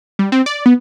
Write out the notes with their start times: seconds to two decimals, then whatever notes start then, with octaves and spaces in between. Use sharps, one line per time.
0.19 G3
0.32 C4
0.46 D5
0.66 B3